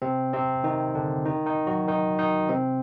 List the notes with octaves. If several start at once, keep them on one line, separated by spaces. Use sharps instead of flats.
C3 C4
C3 C4
D#3 D#4
D3 D4
D#3 D#4
D#3 D#4
F#3 F#4
D#3 D#4
D#3 D#4
C3 C4